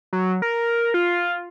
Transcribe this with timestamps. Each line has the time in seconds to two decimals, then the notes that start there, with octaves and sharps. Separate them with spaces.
0.13 F#3
0.42 A#4
0.94 F4